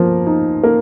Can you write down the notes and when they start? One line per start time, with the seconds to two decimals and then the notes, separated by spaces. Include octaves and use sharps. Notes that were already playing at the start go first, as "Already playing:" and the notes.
Already playing: F3 A#3
0.27 D#4
0.63 A#3